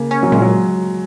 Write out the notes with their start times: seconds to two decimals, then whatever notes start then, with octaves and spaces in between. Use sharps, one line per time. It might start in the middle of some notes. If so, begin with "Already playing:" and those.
Already playing: C#3 A#3
0.11 C#4
0.23 F#3
0.32 A#2 G#3
0.42 F#3